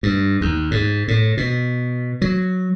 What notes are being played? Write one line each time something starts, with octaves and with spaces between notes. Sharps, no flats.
G2
D#2
G#2
A2
B2
F#3